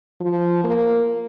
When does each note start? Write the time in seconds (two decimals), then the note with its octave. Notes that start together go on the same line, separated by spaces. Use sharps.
0.21 F3
0.64 A#3